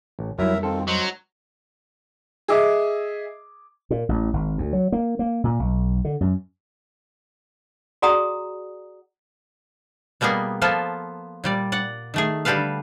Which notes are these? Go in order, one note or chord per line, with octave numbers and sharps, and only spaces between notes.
A1
F2 F#3 G3 E4 A#4 E5 A#5
D#3 C4 F4 A4
F#3 C5 D#5
G#4 D#5 E5 D6
A#2
A1
G#1
D2
F#3
A#3
A#3
A#2
B1
D3
F#2
F#4 G#4 D5 F#5 A#5 D#6
B2 G3 A#3 B3 G#4
F3 A#3 B3 F4 A4
A#2 G3 D5
D5 F#5
D#3 A3 G#4
D3 G3 G4 A4 B4 F5